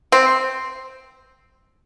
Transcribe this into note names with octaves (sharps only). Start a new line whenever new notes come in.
C4